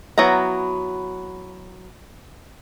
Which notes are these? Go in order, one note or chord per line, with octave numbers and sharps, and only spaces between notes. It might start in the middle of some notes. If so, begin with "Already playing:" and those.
F#3 B3 E4 A#5